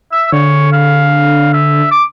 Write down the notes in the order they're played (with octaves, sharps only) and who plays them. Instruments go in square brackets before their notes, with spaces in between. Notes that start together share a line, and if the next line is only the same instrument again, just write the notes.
[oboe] E5 [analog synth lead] E6
[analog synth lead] D3 [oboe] C#5
[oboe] F5
E5
D6